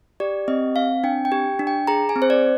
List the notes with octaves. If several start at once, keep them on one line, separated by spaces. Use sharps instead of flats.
G4 D5
C4 D#5
C4 F5
D4 G5
G5
G4
D4
G5
G#4 A#5
G#5
C4
C5
D5